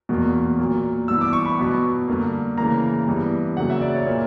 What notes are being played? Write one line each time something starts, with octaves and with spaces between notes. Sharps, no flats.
E2 B2 A#3
A#2 F#3 A#3
G2 E3 B3 E6
D6
C#6
B5
B2 F#3 B3
G2 D3 A#3
C#3 E3 A#3 A#5
G2 E3 G3 B3
C#3 F#3 A#3 F#5
E5
D5
C#5
A#2 A#3